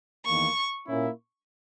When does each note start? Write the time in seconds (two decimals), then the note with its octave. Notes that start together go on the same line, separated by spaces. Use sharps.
0.25 E2 D#3 A#3 C#6
0.87 A#2 A#3 C#4 E4